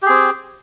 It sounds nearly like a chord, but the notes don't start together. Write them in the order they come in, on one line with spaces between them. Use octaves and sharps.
G4 G#4 C4